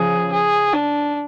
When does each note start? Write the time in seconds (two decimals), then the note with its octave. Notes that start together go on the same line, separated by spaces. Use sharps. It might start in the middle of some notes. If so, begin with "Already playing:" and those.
Already playing: C#3 F3 G#4
0.32 G#4
0.73 D4